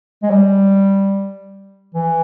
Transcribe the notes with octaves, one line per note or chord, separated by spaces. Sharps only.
G#3
G3
E3